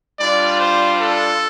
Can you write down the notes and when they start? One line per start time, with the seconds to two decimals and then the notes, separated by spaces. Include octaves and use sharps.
0.20 G3 D4 F4 D5
0.60 C5
1.00 A4